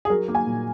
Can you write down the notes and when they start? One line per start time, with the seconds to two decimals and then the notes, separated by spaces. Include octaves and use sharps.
0.05 G#4
0.10 F#3 A#4
0.28 A#3
0.35 G#5
0.47 A#2